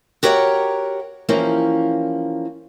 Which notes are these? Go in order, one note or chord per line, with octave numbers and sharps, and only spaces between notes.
F#4 G4 A#4 C#5 E5 F#5
E3 F3 A#3 C#4 G4